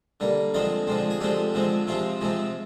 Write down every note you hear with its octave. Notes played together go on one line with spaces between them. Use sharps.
D3 G3 A#3
D3 F3 G#3 C4 D#5
D3 F3 G#3 C4
G#4
D3 F3 G#3 C4 G4
D3 F3 G#3 C4
C3 F3 G#3 C4 F4
C3 F3 G#3 C4